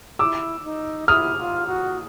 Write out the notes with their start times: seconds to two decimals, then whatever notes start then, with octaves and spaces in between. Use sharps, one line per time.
0.19 E4 D6 E6
0.60 E4
0.64 D#4
1.08 E4 D#6 F6
1.38 F4
1.67 F#4